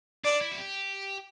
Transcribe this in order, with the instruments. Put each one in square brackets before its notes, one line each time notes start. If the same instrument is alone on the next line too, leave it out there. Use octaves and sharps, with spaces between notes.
[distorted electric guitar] D4 [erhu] D5
[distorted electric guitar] E4
F#4
G4